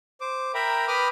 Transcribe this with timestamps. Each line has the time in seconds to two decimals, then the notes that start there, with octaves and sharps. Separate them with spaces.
0.21 C5 D6
0.54 A#4 E5 G5 A#5 B5
0.87 B4 G5 B5 D6 D#6 F6